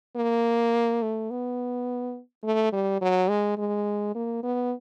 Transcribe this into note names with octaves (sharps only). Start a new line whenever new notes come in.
A#3
A3
B3
A3
G3
F#3
G#3
G#3
A#3
B3